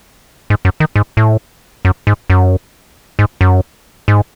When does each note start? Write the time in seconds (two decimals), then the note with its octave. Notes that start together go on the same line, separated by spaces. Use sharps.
0.50 G#2
0.65 F#2
0.80 D#3
0.96 G#2
1.17 A2
1.85 F#2
2.07 G#2
2.30 F#2
3.19 G#2
3.41 F#2
4.08 G#2